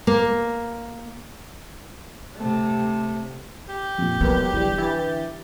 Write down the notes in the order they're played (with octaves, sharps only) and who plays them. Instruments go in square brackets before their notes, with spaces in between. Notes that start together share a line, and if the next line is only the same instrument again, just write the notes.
[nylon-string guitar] A#3
[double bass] C3 A3
[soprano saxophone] G4
[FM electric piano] F2 A#2
[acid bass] E1 [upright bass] F#3 [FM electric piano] B3 A#4 B4
[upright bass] D3 [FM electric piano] E3 G3
[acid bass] E3 [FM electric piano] E4 A6